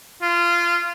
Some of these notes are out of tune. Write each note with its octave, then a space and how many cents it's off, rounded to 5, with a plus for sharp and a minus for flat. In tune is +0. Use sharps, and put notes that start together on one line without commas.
F4 -20